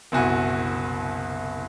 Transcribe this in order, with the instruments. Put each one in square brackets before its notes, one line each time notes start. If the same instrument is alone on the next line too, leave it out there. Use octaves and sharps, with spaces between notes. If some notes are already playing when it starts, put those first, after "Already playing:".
[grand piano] F#1 C2 B2 F#4 G#5